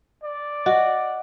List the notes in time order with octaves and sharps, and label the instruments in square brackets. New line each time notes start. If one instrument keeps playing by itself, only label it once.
[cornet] D5
[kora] F#4 [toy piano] D#5